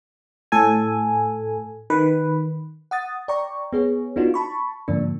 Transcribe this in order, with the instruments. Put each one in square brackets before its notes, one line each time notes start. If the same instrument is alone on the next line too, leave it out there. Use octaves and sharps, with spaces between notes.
[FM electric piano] A2 A4 G#5
D#3 B4
F#5 D#6 A6
D5 G5 A#5 C#6
B3 G#4 C#5
B3 D4 D#4 F4 F#4
A5 B5 C#6
G#2 D3 F3 A#3 D4